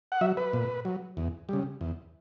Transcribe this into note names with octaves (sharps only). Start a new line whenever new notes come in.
F#5
F#3 E5
B4
A#2
F#3
E2
C#3 G3
E2